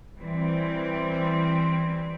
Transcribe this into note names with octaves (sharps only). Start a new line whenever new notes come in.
E3 G3 C4